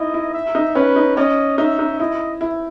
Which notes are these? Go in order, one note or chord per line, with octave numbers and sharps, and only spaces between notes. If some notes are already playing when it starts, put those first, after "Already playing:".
Already playing: D#4 E4 D#5
E4
E5
D#4
C#4 B4
D#4
C#4 D#5
D#4 E5
D#4
E4 D#5
E4